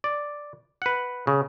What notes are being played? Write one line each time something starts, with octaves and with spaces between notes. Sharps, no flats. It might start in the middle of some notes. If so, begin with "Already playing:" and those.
D5
B4 F#5
C#3